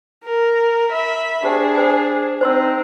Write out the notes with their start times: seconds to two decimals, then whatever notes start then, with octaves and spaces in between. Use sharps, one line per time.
0.24 A#4
0.90 E5 B5
1.44 D4 G4 G#4 C5 G5
1.75 C5 G#5
2.41 C4 D#4 C5 C6 E6